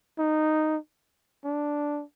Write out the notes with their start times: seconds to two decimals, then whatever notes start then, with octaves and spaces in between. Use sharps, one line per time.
0.19 D#4
1.45 D4